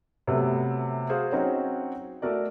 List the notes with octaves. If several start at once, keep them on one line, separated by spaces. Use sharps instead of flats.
C3 F#3 A3 B3
F#4 G#4 C5 F5
F#3 C4 C#4 D#4 F#4
A3 F#4 A#4 D5